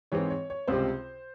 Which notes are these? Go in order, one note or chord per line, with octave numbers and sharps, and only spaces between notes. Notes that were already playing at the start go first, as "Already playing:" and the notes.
G#2 E3 G#3 C4 C#5
C#5
C#5
C#2 C3 G3 C4 C5